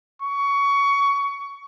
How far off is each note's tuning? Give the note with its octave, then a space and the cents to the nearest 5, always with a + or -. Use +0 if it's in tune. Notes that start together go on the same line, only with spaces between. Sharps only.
C#6 +20